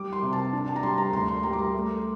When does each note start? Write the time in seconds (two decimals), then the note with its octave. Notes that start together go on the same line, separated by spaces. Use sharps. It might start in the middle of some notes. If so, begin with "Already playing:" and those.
Already playing: G3 D6
0.13 C6
0.23 C3
0.33 A5
0.53 D4
0.68 A5
0.76 A#5
0.83 G3 C6
0.98 A#5
1.13 D2 C6
1.28 C6
1.43 G3 A#5
1.53 D6
1.59 C6
1.74 A3